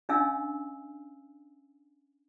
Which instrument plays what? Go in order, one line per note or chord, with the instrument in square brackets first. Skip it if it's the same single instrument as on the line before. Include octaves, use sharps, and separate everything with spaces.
[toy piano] C#4 D4 D#5 F5 G#5 E6